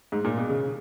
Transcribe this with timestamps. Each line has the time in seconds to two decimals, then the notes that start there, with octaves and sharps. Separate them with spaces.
0.12 G#2
0.24 A#2
0.38 B2
0.49 C#3